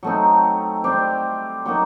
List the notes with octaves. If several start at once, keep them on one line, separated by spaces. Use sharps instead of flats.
F#3 A3 C4 D#4
G3 C4 G4 C5
F#3 A#3 D#4